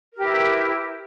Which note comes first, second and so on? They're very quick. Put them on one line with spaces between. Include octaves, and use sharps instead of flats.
A#4 G4 B4 E4